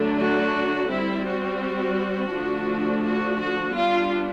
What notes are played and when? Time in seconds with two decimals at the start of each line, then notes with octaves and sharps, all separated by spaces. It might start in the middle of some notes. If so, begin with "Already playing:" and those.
Already playing: D3 F#3 A3 D4
0.18 F#4
0.89 G3 C4 E4
1.25 F#4
2.31 D3 F3 A3 D4
3.02 F#4
3.37 F#4
3.73 G3 B3 D4 F4